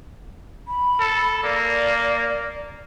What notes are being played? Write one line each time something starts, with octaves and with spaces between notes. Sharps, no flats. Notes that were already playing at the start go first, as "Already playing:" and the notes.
B5
A4
A#3 D5